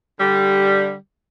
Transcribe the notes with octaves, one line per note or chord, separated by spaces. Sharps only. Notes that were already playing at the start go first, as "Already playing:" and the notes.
D3 G3